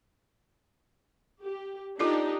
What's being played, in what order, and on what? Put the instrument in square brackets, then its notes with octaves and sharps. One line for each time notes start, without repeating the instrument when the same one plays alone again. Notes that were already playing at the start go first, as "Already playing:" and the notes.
[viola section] G4
[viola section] D4 D#4 G4 [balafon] F4 A4 D5